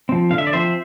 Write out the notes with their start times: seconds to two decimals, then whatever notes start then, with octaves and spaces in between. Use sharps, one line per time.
0.09 F3 C4
0.31 D3 F5
0.38 E5
0.47 D5
0.53 F3 C4 C5 E5